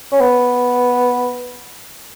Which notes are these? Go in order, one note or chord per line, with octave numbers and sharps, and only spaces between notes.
C#4
B3